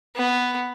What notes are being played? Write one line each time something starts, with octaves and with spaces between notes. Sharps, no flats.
B3